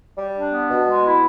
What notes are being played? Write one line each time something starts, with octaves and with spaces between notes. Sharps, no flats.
G3
D4
B3
B2
G#3
E4